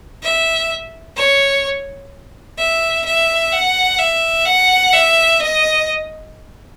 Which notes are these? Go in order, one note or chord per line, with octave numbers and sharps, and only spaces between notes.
E5
C#5
E5
E5
F#5
E5
F#5
E5
D#5